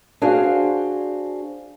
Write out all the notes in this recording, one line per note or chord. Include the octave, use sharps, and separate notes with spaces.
D4 F#4 G#4 C5 F5